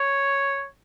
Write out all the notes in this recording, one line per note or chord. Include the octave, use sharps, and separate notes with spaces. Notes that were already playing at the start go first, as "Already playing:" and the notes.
Already playing: C#5